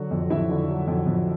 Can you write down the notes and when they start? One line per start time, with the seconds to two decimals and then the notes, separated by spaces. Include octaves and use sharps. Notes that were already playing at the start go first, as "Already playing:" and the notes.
Already playing: D3 F#3 F#4
0.11 F2
0.30 F2 E4 E5
0.50 D3
0.69 F#3
0.88 F2
1.06 F2